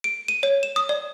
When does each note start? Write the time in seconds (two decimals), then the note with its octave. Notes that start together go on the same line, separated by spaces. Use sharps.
0.04 D7
0.28 D#7
0.43 C#5
0.63 E7
0.76 D#6
0.89 D5